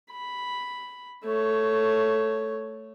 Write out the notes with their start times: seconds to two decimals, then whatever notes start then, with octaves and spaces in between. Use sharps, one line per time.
0.13 B5
1.25 A3 C#5